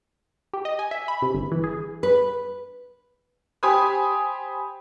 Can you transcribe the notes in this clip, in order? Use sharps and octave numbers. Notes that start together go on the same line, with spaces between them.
G4
D#5
G#5
E5
B5
C3
G1
E3
G#4
B4
G4 C5 G#5 B5 D#6